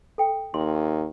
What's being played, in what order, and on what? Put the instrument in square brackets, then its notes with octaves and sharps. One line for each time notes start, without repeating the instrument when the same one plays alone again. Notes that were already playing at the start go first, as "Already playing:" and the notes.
[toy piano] A4 G5
[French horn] D#2 [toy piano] C6